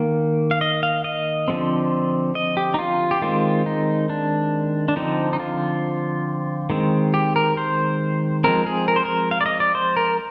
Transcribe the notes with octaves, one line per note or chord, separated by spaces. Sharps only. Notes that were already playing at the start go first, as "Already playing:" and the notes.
Already playing: D#3 A#3
F5
D#5
F5
D#5
D3 F3 G#3 C4
D#5
G4
D#4
F4
G4
D#3 G#3 C4 F4
D#4
D4
D4
D3 F3 C4 D#4
D#4
F4
D#3 G#3 C4
G4
A#4
C5
F3 G#3 C4 A#4
G#4
A#4
C5
A#4
F5
D5
D#5
D5
C5
A#4